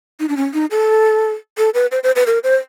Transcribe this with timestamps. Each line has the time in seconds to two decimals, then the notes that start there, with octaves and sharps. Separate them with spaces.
0.20 D#4
0.29 D4
0.37 C#4
0.54 D#4
0.71 A4
1.58 A4
1.74 B4
1.92 C5
2.03 C5
2.16 B4
2.27 A#4
2.44 C5